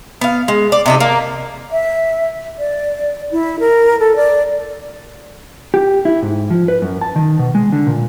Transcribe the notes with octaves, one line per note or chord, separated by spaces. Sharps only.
B3 F5
G#3
D5
C3 D#4 A4
A#3
E5
D5
E4
A#4
A4
D5
G4
E4
G#2
F3
B4
F#2
A5
D#3
B2
G#3
D3
A#2